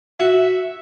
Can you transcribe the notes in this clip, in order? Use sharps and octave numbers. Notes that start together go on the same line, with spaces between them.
F#4 E5